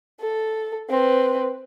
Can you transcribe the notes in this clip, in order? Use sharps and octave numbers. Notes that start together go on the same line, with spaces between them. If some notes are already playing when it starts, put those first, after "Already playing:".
A4
C4 B4